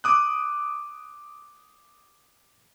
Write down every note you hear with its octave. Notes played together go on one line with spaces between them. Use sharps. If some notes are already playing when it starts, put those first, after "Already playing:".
D6 D#6 F#6